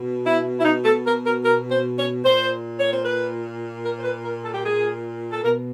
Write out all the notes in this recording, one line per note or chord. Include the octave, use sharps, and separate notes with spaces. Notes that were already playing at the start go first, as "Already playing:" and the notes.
Already playing: B2
E4
E4
D#4
A4
A#4
A#4
A#4
C5
C#5
A#2 C5
C#5
C5
B4
A#4
C5
B4
A#4
A4
G4
G#4
A4
B2 A#4